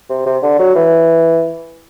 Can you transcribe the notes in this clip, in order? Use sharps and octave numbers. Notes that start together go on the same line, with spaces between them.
C3
C3
D3
F#3
E3